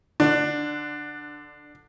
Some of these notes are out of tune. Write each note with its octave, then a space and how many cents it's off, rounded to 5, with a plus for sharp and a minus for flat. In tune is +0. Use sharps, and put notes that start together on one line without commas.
D3 +0 D4 +15